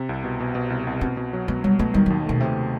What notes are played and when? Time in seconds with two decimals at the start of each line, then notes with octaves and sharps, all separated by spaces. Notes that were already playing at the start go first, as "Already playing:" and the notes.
Already playing: C3
0.09 C2
0.24 B2
0.40 B2
0.55 B2
0.70 C2
0.87 C2
1.01 B2 C4
1.17 B2
1.33 F#3
1.48 B2 B3
1.64 F#3 G3
1.79 B2 A3
1.94 D#3 G3
2.06 F#3
2.10 D#2
2.26 B2 A3
2.40 C3 A3